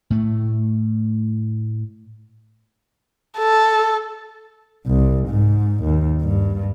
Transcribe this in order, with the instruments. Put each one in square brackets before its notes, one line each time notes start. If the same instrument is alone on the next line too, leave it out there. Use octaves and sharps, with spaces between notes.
[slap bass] A2 A3
[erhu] A4
[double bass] C2
G#2
D#2
G2